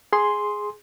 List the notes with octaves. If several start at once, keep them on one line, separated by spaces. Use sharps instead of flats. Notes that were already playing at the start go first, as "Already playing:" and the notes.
G#4 C6